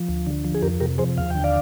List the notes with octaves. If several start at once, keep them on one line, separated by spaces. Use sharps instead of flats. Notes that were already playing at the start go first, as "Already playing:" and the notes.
Already playing: F3
D2
D3
F3
G#4
F2 G4 A#4
C3 G4 A#4
F3 G#4 C5
D#2 F5
D3 G5
D5 F5